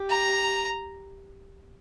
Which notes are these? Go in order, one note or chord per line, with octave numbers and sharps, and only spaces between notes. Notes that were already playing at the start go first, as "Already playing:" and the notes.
Already playing: G4
A#5